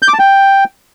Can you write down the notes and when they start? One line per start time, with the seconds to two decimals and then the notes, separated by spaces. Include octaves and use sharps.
0.02 G6
0.08 D6
0.14 A5
0.19 G5